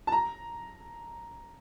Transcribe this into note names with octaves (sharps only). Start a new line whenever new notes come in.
A5
A#5